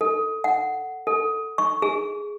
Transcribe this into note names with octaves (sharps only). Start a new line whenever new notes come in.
A4
F#5
A4
C#6
G#4